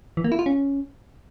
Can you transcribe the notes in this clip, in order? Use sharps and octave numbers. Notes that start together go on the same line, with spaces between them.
E3
A#3
E4
F4
C#4